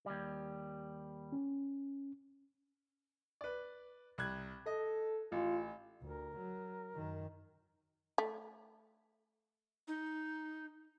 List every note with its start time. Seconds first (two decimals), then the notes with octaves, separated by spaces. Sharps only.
0.06 D#2 G3
1.32 C#4
3.41 B4 D5
4.18 C2 F#6 G#6
4.66 A4 D#5
5.32 A1 F4
6.02 D2 A#4
6.37 F#3
6.93 F#2 D#3
8.18 A3
9.88 D#4